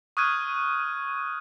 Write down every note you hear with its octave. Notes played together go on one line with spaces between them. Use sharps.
C#6 D#6 F6 F#6 G#6 D#7